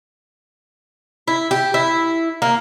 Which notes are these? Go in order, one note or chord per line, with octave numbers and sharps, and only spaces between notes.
E4
G4
E4
A#3